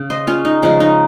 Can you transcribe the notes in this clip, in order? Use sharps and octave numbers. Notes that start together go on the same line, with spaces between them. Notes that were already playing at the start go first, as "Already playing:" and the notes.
Already playing: C#3
C5 D#5
C#4 F4
D#4
C#3 F3 G#3 C#4
D#4